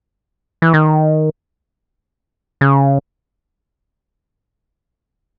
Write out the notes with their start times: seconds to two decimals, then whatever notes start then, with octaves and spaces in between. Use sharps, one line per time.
0.62 E3
0.74 D#3
2.61 C#3